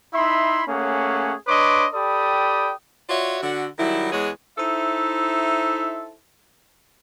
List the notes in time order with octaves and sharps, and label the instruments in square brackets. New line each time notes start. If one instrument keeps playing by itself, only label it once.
[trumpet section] D#4 E4 E5 B5 C6
A3 A#3 C#4 G#4 C#5 F#5
D4 B4 C#5 D#5 C6 D6
G4 A4 D5 G5 B5 D#6
[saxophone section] F4 F#4 C#5 D5 E5
D3 F#4
D#3 F#3 G3 E4
E2 G#3 G#4 C#5 F#5
[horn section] D#4 E4 A4 C5 E5